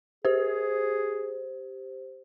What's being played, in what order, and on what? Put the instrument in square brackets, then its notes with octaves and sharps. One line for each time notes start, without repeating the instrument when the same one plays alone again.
[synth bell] G4 C5 [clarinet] G#4